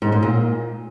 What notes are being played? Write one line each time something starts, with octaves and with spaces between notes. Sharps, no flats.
G#2
G#2
A#2